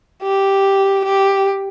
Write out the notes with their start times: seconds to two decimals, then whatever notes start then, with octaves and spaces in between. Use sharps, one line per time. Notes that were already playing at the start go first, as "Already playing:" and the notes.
0.22 G4
1.05 G4